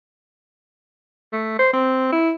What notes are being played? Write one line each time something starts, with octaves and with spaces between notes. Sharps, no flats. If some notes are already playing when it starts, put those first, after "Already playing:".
A3
C5
C4
E4